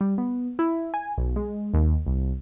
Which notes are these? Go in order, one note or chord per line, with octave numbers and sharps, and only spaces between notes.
G3
B3
E4
G#5
B1
G#3
D#2
C2